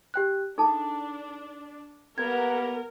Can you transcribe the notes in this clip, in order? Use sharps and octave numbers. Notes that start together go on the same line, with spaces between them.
G4 G5 F#6
D4 D#4 G#4 A4 A5
G3 A#3 B3 A#4 G#6